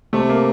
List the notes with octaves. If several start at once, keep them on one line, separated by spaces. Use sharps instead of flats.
C3 A3
A#3